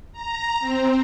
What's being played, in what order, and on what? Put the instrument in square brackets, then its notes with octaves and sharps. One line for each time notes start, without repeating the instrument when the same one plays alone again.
[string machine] A#5
C4